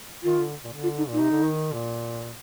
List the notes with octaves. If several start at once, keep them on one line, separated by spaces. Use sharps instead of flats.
D#3 F4
D3
A#2
D3
F4
D#4
A#2 D#4
C3
D3
D#3
A#2